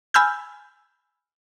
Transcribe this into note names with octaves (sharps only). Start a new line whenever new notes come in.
G#5 B5 E6 F6 G6